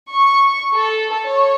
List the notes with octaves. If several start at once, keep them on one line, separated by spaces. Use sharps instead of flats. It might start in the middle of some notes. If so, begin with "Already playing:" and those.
C#6
A4
C#5